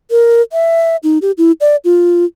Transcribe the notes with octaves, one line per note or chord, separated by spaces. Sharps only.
A#4
E5
D#4
G4
E4
D5
F4